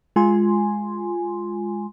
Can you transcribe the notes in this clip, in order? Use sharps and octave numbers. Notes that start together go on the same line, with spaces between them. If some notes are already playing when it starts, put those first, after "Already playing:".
G#3 F4 G#5 C6